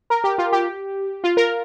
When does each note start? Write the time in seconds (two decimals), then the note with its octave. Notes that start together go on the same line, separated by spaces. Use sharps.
0.10 A#4
0.24 G4
0.38 F4
0.52 G4
1.24 F4
1.37 A#4